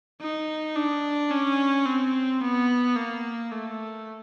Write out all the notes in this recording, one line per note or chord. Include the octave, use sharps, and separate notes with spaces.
D#4
D4
C#4
C4
B3
A#3
A3